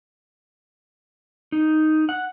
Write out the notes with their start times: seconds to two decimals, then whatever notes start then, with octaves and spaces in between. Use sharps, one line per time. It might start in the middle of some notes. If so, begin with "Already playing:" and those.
1.52 D#4
2.09 F#5